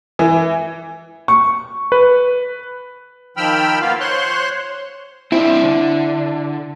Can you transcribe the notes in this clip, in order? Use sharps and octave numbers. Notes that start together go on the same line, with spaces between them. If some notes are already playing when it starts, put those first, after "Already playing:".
E3
C#6
B4
D#3 F3 G5 B5 E6 F6
A#3 B3 F4 F5
C5 C#5 C6 F#6
C4 D4 E4
D3